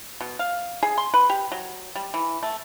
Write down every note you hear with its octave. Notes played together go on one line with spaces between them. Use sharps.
B2
F5
G#4
C6
B4
G4
F#3
G3
E3
A3